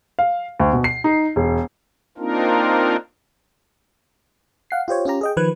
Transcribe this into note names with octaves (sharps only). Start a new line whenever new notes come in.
F5
D2
B2
C7
D#4
E1
A#3 C4 D4 D#4 F4 A#4
F5 F#5 C7
F4 G4 C5 C#5
C#4 F4 G4 A#5
G#4 D#5 G5
D#3 F3 B4 F#6 G#6